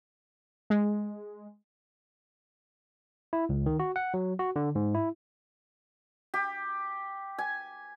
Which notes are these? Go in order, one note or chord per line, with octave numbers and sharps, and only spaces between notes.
G#3
E4
C#2
D#3
F#4
F#5
F#3
F#4
D3
G#2
E4
G4
G#5